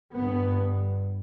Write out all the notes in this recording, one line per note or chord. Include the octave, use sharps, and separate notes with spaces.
G1 G2 B3